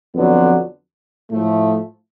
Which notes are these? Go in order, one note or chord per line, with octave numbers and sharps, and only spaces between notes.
F2 D3 F#3 B3 D4
A2 F3 A3